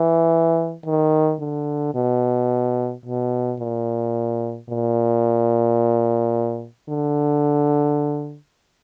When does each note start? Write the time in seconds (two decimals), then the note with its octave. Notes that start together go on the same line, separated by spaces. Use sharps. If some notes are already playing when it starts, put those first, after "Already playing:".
Already playing: E3
0.86 D#3
1.40 D3
1.95 B2
3.05 B2
3.60 A#2
4.69 A#2
6.89 D3